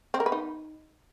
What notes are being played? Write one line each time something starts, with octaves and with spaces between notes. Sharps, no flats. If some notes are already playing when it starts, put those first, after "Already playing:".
C4
A#4
B4
D#4